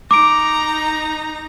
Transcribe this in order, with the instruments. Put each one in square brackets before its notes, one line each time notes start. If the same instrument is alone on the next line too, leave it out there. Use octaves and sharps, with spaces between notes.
[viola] D#4 A#5 [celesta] D6 D7